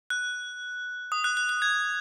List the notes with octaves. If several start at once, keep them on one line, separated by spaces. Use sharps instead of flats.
F#6
D#6
F#6
F#6
F#6
G#6